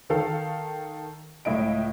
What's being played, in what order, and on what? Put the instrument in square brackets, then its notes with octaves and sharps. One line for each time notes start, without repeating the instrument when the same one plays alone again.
[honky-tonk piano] D#3 A4 F5
C#2 A2 E4 D#5 D7